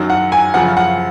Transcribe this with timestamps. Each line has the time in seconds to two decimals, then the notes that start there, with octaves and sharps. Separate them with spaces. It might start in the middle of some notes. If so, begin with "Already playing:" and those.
Already playing: F#2 D#3 F#3
0.10 F#5
0.32 G#5
0.54 F#2 C#3 F3 F#5
0.77 F#5